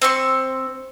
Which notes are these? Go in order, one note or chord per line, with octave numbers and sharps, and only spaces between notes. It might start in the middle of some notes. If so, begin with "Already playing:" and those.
C4 C6 C#6